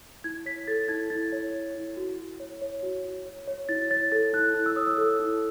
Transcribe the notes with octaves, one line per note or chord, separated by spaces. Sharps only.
E4 G#6
C#5 B6
A4 A6
E4 G#6
E4 A6
C#5
A4
E4
F#4
F#4
C#5
C#5
F#4
F#4
C#5
C#5
E4 A6
C#5 A6
A4 A6
E4 F#6
E4 F#6
E6
C#5 D#6
E6
A4
E4